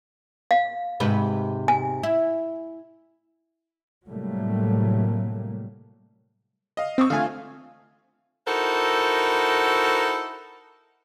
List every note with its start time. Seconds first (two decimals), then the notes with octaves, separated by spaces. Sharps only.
0.51 F5
1.00 G#2 C3 B4
1.68 G#5
2.03 E4
4.08 A2 C3 F#3 G3 A3 A#3
6.77 D#5 F5
6.98 C4 C#6 D#6 E6
7.10 D3 A3 F4 F5 G#5
8.47 D#4 E4 F#4 A4 A#4 C5